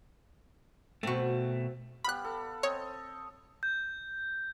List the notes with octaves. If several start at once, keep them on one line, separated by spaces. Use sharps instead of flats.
B2 A3 C4 F#4
G3 B3 F5 B5 F#6
A4
C4 C#5 D#5
G6